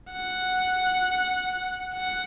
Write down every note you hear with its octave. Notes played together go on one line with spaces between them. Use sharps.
F#5
F#5